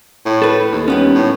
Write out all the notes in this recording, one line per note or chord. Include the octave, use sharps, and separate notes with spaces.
A2
A4 B4
D#2
G3 B3 C#4
A2